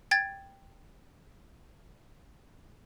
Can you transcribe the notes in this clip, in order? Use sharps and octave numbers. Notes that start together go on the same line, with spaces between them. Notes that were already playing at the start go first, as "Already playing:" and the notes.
G5 G#6 A6